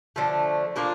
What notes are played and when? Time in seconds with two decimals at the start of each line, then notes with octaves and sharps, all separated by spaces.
0.16 D3 F3 A3
0.76 F3 A#3 D4 F4